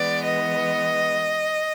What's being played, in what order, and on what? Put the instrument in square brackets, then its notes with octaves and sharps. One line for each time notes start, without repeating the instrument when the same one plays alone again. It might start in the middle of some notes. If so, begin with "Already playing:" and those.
Already playing: [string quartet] E3 G#3 B3 D5
D#5